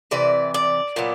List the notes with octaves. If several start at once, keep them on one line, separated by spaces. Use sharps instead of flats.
C3 E3 D5
D5
A#2 F#3 B3